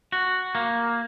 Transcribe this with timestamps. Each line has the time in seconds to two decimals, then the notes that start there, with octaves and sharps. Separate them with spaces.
0.12 F#4
0.55 A#3